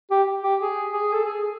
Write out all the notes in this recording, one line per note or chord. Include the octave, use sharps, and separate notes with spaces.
G4
G4
G#4
G#4
A4
G#4